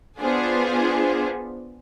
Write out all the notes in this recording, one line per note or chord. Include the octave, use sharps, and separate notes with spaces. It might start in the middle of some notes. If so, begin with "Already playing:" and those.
B3 D4 F4 G#4 C5